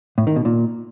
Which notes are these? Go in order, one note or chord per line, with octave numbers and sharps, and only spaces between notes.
A2
D#3
B2
A#2